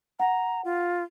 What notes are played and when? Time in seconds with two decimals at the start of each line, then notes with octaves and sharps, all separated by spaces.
0.20 F#5 A#5
0.65 F4